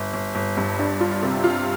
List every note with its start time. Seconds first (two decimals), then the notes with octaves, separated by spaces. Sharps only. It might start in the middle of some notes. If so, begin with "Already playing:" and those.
Already playing: G1
0.13 G1
0.35 G1
0.57 G2
0.79 D4
1.00 F4
1.23 C3
1.44 F4